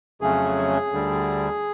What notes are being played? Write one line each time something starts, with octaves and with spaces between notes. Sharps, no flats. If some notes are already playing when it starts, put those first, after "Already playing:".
F2 C#3 F#3 A3 C#4 G#4
D2 D3 G3